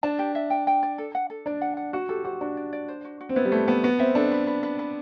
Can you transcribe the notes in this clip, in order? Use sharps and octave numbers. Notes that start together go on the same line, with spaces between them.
D4 A5
G4
E5
G5
G5
D5
A4
F#5
A4
D4 D5
F#5
F#5
F#4 F#5
G4 A4
F#4 C5
D4 F#4
D5
D5
C5
F#4
F#4
C4
B3 E4
G3
A3 E4
B3 A5
B3 F#4
C4 E5
D4 A4
B4
B4
B4
B4